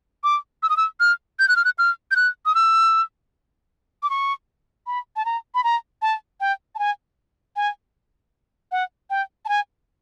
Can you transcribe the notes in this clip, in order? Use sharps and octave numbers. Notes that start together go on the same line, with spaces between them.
D6
E6
D#6
E6
F6
G6
F#6
F6
F#6
F6
G6
F#6
D#6
E6
D6
C#6
B5
A5
A#5
B5
A#5
A5
G5
A5
G#5
G#5
F#5
G5
A5
G#5